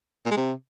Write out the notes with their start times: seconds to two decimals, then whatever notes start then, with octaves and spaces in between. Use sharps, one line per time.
0.25 A#2
0.31 G#3
0.37 C3